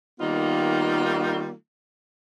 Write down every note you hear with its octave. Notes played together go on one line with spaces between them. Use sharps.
D#3 G3 A#3 B3 D#4 F4